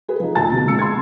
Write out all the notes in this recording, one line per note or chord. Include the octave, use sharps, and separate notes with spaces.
G#4 B4
F3 D#4
D2 A#2 F4 A5 A6
B2
D3 F3 G#3 C4 E6 C#7
C6 G#6